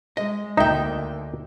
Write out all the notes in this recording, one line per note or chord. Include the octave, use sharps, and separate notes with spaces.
G#3 D#5
D2 A#3 D#4 E5 G5